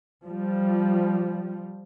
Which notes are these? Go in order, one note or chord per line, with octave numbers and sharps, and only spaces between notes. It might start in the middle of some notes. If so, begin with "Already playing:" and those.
F3 G3